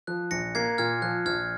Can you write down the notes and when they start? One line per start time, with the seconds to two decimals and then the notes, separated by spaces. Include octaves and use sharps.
0.07 F3 F#6
0.31 A#1 A#6 C#7
0.55 A#3 G#6 C7
0.78 A#2 F6 G#6
1.02 F3 F#6
1.26 A#1 F6 G#6